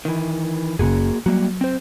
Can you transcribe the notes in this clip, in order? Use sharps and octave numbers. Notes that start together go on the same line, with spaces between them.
D#3 E3
F#1 C#3 A#3 F#4 G#4
F#3 G3 A#3 F#4
C4 C5